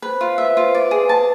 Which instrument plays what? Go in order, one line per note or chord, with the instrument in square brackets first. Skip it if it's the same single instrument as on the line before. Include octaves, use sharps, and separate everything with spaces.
[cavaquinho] B4 [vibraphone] C5
[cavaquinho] F4
[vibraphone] B4 [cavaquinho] E5
[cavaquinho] F4 [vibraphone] C5
[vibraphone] B4 [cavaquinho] D5
[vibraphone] B4
[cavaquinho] G#4
[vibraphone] B4
[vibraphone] B4 [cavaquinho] A5